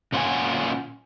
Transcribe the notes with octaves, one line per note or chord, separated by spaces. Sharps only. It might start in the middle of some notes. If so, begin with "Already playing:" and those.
A#2 C#4 F4 C5 F#5 G#5